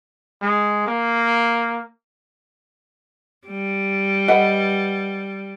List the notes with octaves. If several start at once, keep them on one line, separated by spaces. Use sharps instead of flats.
G#3
A#3
G3
B4 D#5 F#5